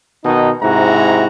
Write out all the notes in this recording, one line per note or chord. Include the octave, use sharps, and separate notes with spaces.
B2 D#3 D#4
G#2 C3 E4 F#4 A#5